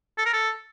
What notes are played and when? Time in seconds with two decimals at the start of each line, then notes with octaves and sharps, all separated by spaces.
0.18 A4
0.26 A#4
0.33 A4